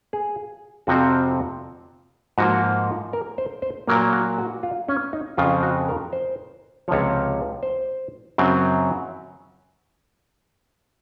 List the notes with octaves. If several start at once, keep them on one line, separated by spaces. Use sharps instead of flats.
G#4
F2 C3 F3 C4 F#4
G#2 F3 A#3 F#4
A#4
C5
C5
A#2 F#3 A#3 A#4
F#4
F#4
F4
C#4
D#4
F2 C#3 F3 F4
F#4
A#4
C5
C#2 C3 F3 C#5
C5
F#2 C#3 F#3 C4